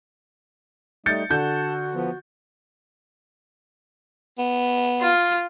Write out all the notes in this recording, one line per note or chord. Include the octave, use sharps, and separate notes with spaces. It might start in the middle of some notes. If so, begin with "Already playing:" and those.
G3 A3 D#4 G6 A6 C#7
D3 F#4 F#5 A5 G6
F3 B3
B3
F4